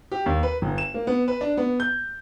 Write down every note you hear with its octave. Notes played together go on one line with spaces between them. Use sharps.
G4
D#2
B4
G1
E7
A#3
B3
B4
D4
B3
G6